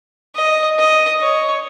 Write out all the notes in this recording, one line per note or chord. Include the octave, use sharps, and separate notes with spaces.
D#5
D#5
C#5